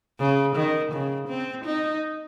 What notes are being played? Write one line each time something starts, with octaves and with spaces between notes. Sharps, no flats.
C#3
D#3
C#3
C4
D#4